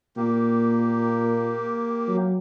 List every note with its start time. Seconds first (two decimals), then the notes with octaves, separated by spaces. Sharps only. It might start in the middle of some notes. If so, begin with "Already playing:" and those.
0.17 A#2 A#3 G4
2.08 F#3